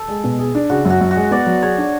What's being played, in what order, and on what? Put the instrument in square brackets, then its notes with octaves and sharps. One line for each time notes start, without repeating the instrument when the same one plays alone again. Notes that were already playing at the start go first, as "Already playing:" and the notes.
Already playing: [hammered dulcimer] A4
[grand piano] G#3
B2
G#4
D4
[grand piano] C#3 [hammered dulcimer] F#4
[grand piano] F#2
[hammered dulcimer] F#4
[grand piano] F#2
[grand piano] G#3 [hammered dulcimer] F#4
[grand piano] B3 [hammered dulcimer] D5
[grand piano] F#3
[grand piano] G#4 [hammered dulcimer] C#5
[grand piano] D4